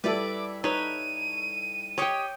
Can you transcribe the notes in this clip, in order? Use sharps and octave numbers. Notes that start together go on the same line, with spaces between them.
G3 E4 A4 B4 D5 E5 D6
D#4 B4 C#5 D#7
G4 C#5 D#5 G5 C#6